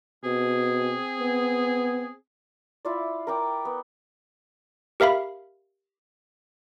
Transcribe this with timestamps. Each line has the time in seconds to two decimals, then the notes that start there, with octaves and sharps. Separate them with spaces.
0.24 B2 C4 G#4
1.20 B3
2.85 E4 F4 D5
3.27 A#4 F#5 G5 D6
3.65 B3
5.00 G4 A#4 E5 F5 B5